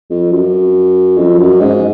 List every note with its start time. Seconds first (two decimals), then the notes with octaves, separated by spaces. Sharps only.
0.10 F2
0.31 F#2
1.18 F2
1.38 F#2
1.61 G#2